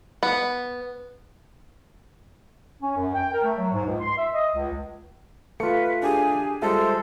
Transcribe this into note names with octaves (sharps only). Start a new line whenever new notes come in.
B3
C#4
F#2
G5
A#4
A3
F#3
G#2
C#2
C6
E5
D#5
C#2
A3 F4 B4 C#7
D4 G4 G#4 G#5
G3 G#3 F4 A4 C5 E5